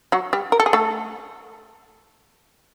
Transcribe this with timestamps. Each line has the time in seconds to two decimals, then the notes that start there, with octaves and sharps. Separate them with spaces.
0.12 F#3 F#4
0.33 G3 G4
0.52 A#4
0.60 A4
0.66 G#4
0.73 A3 A4